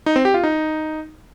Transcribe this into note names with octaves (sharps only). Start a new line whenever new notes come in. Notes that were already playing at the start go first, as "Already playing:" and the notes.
D#4
C4
G4
F4
D#4